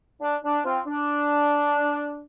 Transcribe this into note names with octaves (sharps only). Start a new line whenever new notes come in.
D4
D4
C4 F4
D4